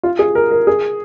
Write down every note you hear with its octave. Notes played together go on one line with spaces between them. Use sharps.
F4
G#4
A#4
A#4
G#4